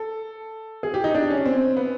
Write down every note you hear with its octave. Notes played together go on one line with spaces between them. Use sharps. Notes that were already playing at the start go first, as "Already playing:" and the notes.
Already playing: A4
G#4
G4
D#4
D4
C#4
C4
B3